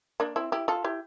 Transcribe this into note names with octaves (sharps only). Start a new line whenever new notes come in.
A#3 D4
C4 E4
E4 G4
F4 A4
E4 G4